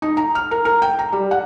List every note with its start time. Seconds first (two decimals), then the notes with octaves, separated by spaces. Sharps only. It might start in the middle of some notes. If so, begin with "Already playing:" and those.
0.02 D#4
0.17 A#5
0.35 F6
0.51 A#4
0.65 A#4
0.82 G5
0.99 A#5
1.12 G3
1.31 F#5